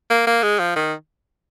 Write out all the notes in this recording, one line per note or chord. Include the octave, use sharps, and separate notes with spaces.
A#3
A#3
G#3
F3
D#3